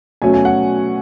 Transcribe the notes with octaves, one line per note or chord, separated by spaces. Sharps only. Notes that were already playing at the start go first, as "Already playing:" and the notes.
B2 F#3 A3 C#4 G#5
G#5
F#5